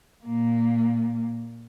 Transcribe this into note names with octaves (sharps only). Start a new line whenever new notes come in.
A#2 A#3